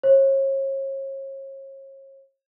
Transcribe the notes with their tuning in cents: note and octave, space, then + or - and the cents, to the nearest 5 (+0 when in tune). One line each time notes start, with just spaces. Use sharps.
C#5 -40